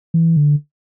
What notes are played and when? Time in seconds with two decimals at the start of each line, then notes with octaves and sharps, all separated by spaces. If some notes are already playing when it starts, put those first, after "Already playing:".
0.14 E3
0.37 D3